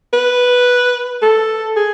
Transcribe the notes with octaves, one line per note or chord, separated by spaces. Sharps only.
B4
A4
G#4